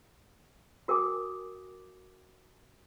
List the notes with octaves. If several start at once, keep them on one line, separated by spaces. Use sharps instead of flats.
F#4 A#4 G5 G#5 D6 D#6